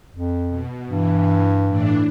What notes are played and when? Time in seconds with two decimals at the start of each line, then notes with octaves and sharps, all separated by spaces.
0.14 F2
0.49 B2
0.88 G2 E3
1.67 A2 E3 D4